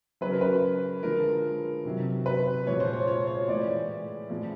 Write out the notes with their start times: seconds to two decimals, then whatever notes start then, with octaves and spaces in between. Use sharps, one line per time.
0.21 C#3 F#3 B4
0.31 A#4
0.41 B4
1.03 D3 F3 G#3 A#4
1.85 C3 D#3 F#3
2.26 B4
2.66 A#2 F3 G#3 C#5
2.80 C5
2.93 C#5
3.08 C#5
3.27 C#5
3.48 A2 E3 G#3 D5
4.30 A2 F3 G#3